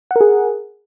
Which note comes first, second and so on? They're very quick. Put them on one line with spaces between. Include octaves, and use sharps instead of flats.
F#5 A#4 G#4